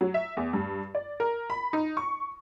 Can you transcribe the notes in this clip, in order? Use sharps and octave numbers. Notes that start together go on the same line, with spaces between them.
F#3
E5
E2
G2
D5
A#4
B5
D#4
C#6